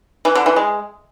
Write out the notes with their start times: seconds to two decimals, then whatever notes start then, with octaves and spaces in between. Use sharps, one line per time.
0.25 E3
0.35 D3
0.46 E3
0.56 G#3